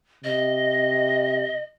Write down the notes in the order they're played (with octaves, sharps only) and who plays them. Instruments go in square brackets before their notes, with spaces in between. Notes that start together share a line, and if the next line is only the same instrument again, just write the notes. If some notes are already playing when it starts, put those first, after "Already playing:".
[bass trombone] C3 [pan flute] D#5